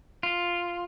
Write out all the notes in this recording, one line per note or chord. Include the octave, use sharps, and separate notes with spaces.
F4